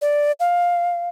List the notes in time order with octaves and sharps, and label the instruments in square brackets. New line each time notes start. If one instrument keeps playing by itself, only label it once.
[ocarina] D5
F5